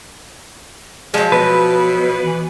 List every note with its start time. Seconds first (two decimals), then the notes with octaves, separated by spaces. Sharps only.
1.14 F3 F#3 G#3
1.32 B2 B4
2.22 E3